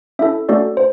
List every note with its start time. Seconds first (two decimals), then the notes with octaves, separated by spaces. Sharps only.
0.19 C#4 E4 A4 E5
0.49 A3 C#4 F#4 A4 D5
0.77 C5